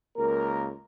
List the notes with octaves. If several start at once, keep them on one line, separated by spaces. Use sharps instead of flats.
C#2 A#3 A#4